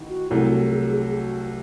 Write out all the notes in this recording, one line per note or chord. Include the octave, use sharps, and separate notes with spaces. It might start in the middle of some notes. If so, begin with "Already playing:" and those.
Already playing: A1 D#3
F#4
C2 C3 F#3 A3 E4
F#4
G#4
G#4
F#4